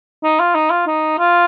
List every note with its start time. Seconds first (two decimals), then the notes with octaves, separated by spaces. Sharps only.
0.23 D#4
0.39 F4
0.55 D#4
0.70 F4
0.87 D#4
1.19 F4